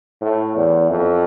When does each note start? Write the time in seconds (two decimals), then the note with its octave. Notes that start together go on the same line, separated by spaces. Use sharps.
0.21 A2
0.56 E2
0.90 F2